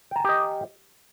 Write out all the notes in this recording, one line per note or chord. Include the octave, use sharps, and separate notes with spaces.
G4 D#5 G5 G#5 A#5